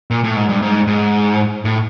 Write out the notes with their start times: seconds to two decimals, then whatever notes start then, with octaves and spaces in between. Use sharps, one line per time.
0.11 A#2
0.24 A2
0.36 G#2
0.49 G2
0.62 G#2
0.87 G#2
1.65 A2